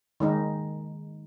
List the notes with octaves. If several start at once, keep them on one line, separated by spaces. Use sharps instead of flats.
D#3 G#3 D#4